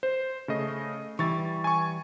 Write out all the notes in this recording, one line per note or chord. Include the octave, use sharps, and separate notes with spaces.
C5
C#3 A3 D#5
E3 G3 C#6 A6
G#5 C#6